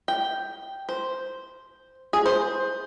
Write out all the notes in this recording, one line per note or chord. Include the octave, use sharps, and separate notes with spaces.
G5
C5
G#4
C5